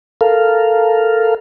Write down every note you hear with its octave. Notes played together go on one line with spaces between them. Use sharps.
A4 A#4 F5